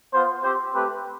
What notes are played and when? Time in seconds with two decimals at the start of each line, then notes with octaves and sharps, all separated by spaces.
0.13 B3 F4 C5
0.43 C4 G4 C5
0.73 A3 C4 G4 B4